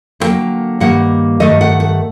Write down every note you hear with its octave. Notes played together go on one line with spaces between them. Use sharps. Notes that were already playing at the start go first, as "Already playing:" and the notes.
D#2 D3 F#3 A#3 G5
G2 D#3 G3 A#3 F#5
G2 D#3 A3 D#5
F#5
F#5